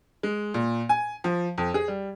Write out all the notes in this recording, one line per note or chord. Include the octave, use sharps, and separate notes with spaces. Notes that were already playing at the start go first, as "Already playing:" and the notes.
G#3
A#2
G#5
F3
F2
G#4
G3